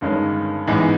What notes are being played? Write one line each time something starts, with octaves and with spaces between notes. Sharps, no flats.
G1 G2 D#3 G#3 C#4
A1 G#2 E3 G#3 B3